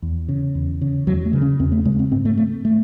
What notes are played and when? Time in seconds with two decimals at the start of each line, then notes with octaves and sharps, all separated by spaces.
0.02 E2
0.29 C#3
0.55 E2
0.81 C#3
1.07 E2 F#3
1.25 A3
1.33 C#3
1.42 C#4
1.60 E2 C4
1.72 A3
1.85 C#3 G#3
1.99 C4
2.12 G#2 C4
2.25 A3
2.38 A3
2.65 A3